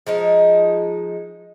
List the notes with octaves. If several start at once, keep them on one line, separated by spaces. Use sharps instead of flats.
F3 G#3 D#4